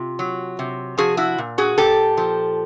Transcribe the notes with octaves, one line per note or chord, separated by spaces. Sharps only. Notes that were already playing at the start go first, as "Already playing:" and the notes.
Already playing: C3 F4
F#3
C3
F3 F#4 G#4
E4 F#4
A#2
F#4 G#4
A#2 G4 A4
F3